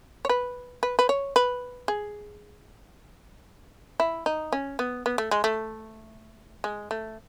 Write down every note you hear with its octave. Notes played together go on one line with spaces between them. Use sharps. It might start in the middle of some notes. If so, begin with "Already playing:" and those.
C#5
B4
B4
B4
C#5
B4
G#4
E4
D#4
C#4
B3
B3
A3
G#3
A3
G#3
A3